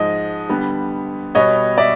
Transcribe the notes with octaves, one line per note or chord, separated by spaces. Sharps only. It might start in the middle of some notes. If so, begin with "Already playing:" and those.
Already playing: G#2 F3 G#3 D#5
D3 G3 B3
B2 G3 B3 C#5 D#5
D5 E5